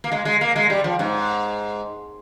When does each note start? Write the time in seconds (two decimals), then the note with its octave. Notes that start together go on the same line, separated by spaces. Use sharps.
0.04 A#3
0.12 G#3
0.25 G#3
0.41 A#3
0.56 G#3
0.70 G3
0.84 F3
0.99 G#2